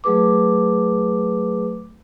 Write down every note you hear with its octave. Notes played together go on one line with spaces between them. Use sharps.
F#3 A3 G#4 B4 D6